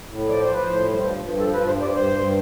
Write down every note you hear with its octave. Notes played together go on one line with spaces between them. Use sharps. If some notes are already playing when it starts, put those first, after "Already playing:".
A2
F3 D5
C5
F3 B4
A2 C5
G2
F3
G2
F3 A4
B4
G2
C5
G2 D5
G2 C5
G2